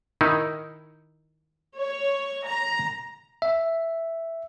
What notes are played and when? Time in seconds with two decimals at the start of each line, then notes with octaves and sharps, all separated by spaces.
0.21 D#3 D#4 E4
1.78 C#5
2.47 A#5
3.42 E5